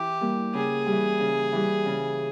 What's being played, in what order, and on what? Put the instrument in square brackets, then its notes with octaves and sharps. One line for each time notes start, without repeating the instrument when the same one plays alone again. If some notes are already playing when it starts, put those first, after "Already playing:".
Already playing: [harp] E3 [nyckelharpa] G4
[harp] G3 A#3
[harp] C#3 [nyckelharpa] G#4
[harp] E3 G3
C#3
E3 G3
C#3